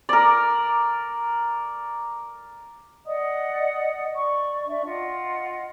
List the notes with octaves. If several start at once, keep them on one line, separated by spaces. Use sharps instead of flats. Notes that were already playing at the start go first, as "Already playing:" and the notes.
A#4 D5
D5 D#5 F#5 D#6
D5 C#6
D4 D5 E5
F4 D#5 F#5